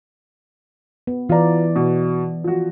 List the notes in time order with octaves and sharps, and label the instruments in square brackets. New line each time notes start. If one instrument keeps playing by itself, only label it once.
[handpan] B3
[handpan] E3 D5 [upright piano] F4 A#5
[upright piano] B2
F3 F#4